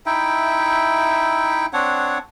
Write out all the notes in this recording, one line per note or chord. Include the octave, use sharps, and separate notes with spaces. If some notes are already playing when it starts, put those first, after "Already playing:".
D#4 E4 E5 G5
C4 D4 C#5 F#5